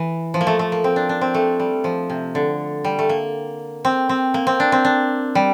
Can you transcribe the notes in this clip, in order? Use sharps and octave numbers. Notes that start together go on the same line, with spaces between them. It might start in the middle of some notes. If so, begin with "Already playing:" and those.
Already playing: E3
F3
A#3
A3
A3
A#3
C4
D4
D4
C4
A3
G3
F3
C3
D3
G3
A3
A#3
C4
C4
A#3
C4
D4
C4
D4
G3